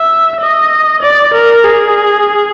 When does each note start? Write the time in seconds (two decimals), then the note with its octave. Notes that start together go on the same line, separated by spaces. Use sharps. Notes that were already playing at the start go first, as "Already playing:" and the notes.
Already playing: E5
0.40 D#5
1.02 D5
1.33 A#4
1.64 G#4